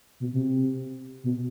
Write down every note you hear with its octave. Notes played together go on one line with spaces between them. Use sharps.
B2
C3
B2